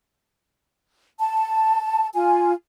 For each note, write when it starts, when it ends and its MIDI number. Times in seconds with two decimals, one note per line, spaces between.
1.20 2.08 81
2.14 2.53 65
2.14 2.53 80